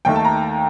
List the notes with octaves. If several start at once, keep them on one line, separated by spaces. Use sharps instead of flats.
D#2 D#3 A3 G5
A5
A#5